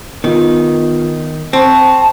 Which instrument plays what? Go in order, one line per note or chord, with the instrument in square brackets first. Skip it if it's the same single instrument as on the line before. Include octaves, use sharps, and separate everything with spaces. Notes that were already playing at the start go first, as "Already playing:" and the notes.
[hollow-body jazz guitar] D#3 [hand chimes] B3 F4
[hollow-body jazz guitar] C4 [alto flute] A5 [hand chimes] C#6